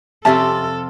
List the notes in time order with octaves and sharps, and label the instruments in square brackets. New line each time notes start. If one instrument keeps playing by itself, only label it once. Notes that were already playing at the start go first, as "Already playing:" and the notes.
[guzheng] F2 C3 F4 [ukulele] C#4 G4 E5 [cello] A4 [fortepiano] A5